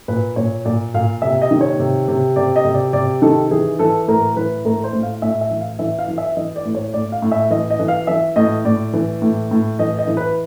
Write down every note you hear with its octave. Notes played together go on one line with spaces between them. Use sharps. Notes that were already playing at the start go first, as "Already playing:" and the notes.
A#2 B4
A#2 C#5
A#2 D5
A#2 F5
C3 E5
D#5
D#3
C#5
C3
C3
C3 D5
D#5
C3
D5
C3 D5
D#3 A4
E3 G#4
E3 A4
A2 A#4
E3 B4
A2 A#4
C5
A2
F5
A2 E5
E5
E3
F5
E3 E5
F5
E3
E5
E3 D#5
D5
A2
C#5
A2 D5
F5
A2
E5
E3 D#5
D#5
E3
F5
E3 E5
A2 D#5
A2 D5
E3
A2
A2
E3 D#5
D#5
E3
B4